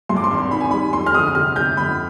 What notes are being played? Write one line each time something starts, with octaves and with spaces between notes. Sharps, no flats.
G2 C6
D6
C6
G#1
D#3 B5
G#5
G3 B5
F2 C6
F6
G1 D#6
C3 F6
G1 G6
F2 B5